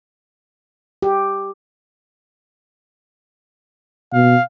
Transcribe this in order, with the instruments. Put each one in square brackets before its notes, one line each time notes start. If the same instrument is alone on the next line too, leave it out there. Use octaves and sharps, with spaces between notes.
[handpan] G4
[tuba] B2 [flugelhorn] F5